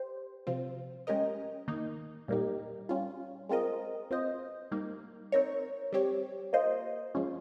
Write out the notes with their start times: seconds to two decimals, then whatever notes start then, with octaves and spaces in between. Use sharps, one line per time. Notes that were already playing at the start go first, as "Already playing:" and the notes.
Already playing: G4 C5
0.47 C3 F3 C4 F4
1.07 G#3 C#4 G4 A#4 D#5
1.68 D#3 A#3 D#4
2.28 A#2 G3 A#3 D#4 G4
2.89 G3 C#4 F4
3.49 G#3 C4 F4 A#4 D#5
4.11 C4 F4 C5 D#5
4.71 G3 A#3 D#4
5.32 C4 D#4 A#4 C#5
5.92 G3 C4 G4 C#5
6.53 A#3 F4 C5 D#5
7.15 F3 G#3 C#4 F4